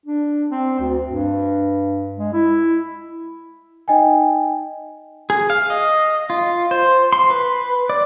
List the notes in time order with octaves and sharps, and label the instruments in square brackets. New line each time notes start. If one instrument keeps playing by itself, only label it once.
[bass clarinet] D4
C4
D2
G2
G#3
E4
[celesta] D#4 D#5 G5 G#5
[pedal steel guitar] G#4
F5
D#5
F4
C5
C6
B4
D5